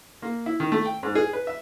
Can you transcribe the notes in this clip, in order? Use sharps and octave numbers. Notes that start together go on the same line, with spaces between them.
A#3
E4
D#3
A3
G5
G#2
G#4
B4
E5